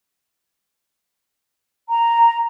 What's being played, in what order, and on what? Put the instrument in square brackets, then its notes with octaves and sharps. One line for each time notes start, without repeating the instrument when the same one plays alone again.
[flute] A#5